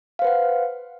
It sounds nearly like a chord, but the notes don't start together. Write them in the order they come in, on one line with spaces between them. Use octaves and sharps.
F5 C5 B4 F#5